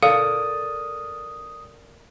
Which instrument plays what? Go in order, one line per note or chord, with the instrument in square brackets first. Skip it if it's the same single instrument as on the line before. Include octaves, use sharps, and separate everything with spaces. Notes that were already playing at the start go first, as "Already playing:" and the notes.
[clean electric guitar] A4 A#4 D5 [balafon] F5 [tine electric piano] D#6